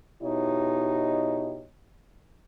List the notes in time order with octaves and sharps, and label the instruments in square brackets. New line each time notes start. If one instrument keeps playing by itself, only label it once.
[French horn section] B2 D#4 E4 G4 C#5 D#5